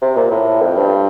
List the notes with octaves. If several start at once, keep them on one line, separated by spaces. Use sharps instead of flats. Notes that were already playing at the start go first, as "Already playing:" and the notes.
C3
A#2
A2
F2
G2